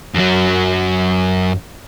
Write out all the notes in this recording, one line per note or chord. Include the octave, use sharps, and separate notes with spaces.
F#2 F#3